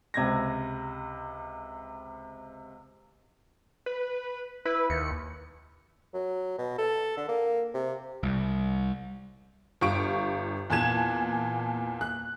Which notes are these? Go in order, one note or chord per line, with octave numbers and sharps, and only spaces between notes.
C#2 C3 G#6 A#6
B4
E4 B4
D#2 C#7
F#3
B2
A4
D3
A#3
C3
C2
G1 G4 F5 C#6 D7
E2 A#2 A5 F#6 G#6 E7
F#6